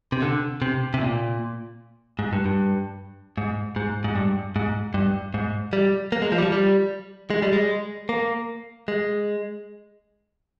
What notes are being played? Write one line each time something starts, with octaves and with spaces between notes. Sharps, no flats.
C3
D3
C3
C3
A#2
G#2
G2
G2
G#2
G#2
G#2
G2
G#2
G2
G#2
G3
A#3
G#3
F3
G3
F3
G3
G#3
G3
G#3
A#3
G#3